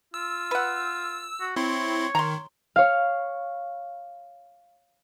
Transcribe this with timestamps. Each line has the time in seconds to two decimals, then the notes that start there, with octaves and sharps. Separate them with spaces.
0.14 F4 E6
0.51 B4 F#5
1.41 F#4
1.56 C4 E4 C#5 C6
2.15 D#3 A#5 C6
2.76 C#5 F5